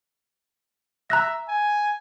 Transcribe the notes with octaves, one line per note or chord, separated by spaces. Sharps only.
E5 A#5 F#6 A#6
G#5